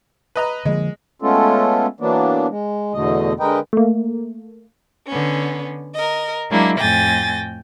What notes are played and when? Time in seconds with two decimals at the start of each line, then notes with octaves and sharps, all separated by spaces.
0.36 B4 D#5 A#5
0.65 D3 F3 G#3 A#3
1.22 G#3 A3 B3 C#4 F4 A4
2.00 E3 F#3 A#3 B3 D4
2.49 G#3
2.93 E2 B2 D3 A3 D#5
3.40 D3 G#3 A#4 B4 D#5 G5
3.73 A3 A#3
5.07 D3 B3 C#4
5.95 A#4 D#5
6.50 F#3 G#3 A#3 D4 E4
6.79 F2 A2 G5 G#5 A6 A#6